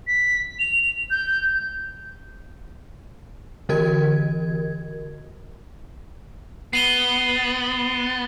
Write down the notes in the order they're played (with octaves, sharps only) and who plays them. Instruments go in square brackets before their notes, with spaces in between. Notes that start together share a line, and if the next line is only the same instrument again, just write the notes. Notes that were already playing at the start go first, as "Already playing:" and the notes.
[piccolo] B6
F7
G6
[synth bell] D3 E3 F#4 A#4 D#5 G#6
[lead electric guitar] B3 [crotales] C7 D#7 G7